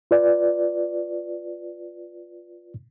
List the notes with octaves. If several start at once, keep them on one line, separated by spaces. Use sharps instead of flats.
F4 B4 D5